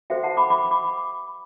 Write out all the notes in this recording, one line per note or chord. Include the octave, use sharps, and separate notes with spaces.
F#4 A4 C5 E5 G5
F#5 A5
B5 D6
B5 D6
B5 D6